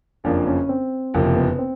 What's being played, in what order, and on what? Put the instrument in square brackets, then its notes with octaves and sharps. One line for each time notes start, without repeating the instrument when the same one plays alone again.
[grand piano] F#1 F2 C#3 F3 A#3 [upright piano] D4
[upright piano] C#4
C4
[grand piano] F#1 F2 C3 F3 [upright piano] A#3
[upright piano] B3
C4